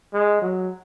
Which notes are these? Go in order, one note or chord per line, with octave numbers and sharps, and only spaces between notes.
G#3
F#3